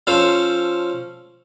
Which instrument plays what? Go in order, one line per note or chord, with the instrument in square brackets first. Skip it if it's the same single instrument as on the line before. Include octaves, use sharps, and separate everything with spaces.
[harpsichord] F3 C#4 A4 C5 A5